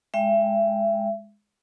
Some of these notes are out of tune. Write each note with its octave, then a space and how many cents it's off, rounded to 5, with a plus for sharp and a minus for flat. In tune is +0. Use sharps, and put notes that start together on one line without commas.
G#3 +0 E5 +30 G5 +0